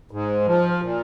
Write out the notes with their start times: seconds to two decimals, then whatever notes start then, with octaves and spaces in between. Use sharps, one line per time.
0.11 G#2
0.46 F3
0.82 A#2